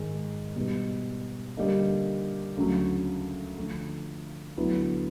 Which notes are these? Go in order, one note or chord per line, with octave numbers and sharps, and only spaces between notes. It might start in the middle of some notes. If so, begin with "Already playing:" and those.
Already playing: G#2 D#3 G#3
B2 G3 B3 D#4
D3 G3 A#3 D#4
D2 C#3 F#3
D3 F3 A3
D2 D3 F#3 B3 E4